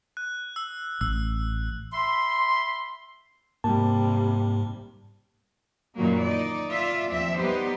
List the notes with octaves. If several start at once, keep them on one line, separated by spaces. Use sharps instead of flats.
F#6
E6
A1 E6
E5 B5 C6
G#2 C3 G3 A#3 A5
F#2 A#2 D#3 E3 F#3 A#3
D#4 D5
F4 D5 E5
D#2 F3 C4 E5
G3 B3 D#4 G4 C5